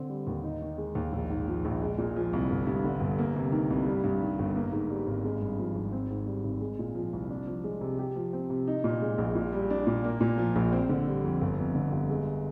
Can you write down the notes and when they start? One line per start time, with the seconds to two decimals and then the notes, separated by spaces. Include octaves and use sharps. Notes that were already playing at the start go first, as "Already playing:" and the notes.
Already playing: D3 C4
0.09 G3
0.27 D#2
0.44 D#4
0.62 D#3
0.78 G#3
0.95 D#2
1.12 A#1
1.30 G#2
1.47 F3
1.65 A#1
1.82 G#3
1.98 A#2
2.16 F3
2.33 C2
2.50 G1
2.67 G2
2.84 D3
3.01 G1
3.19 A#3
3.36 C3
3.52 D#3
3.70 C2
3.86 G3
4.04 G2
4.22 D#3
4.39 G1
4.55 A#3
4.72 G#2
4.90 G3
5.07 G#1
5.24 G#3
5.41 G2
5.59 F3
5.75 G#1
5.92 C4
6.10 G#2
6.26 G3
6.44 G#1
6.61 G#3
6.79 A#2
6.95 F3
7.13 C2
7.29 D4
7.47 F3
7.64 G#3
7.81 C3
7.99 G4
8.16 F3
8.33 C4
8.50 C3
8.67 D#4
8.84 A#2
9.02 G#3
9.18 A#1
9.35 A#2
9.53 G3
9.70 D4
9.87 A#2
10.04 A#3
10.21 A#2
10.38 F3
10.55 A#1
10.72 C4
10.89 D3
11.07 G3
11.24 F2
11.41 G1
11.58 F2
11.75 D3
11.93 G1
12.10 G#3